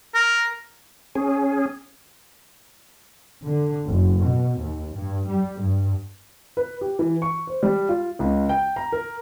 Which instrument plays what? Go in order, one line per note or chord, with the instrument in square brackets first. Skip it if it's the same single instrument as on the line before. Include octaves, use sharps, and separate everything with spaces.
[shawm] A#4
[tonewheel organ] C#4 G#4
[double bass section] D3
F#1
B2
D#2
G2
G3
G2
[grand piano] B4
G4
E3
C#6
C5
G3
F4
C#2
G5
A#5
A#4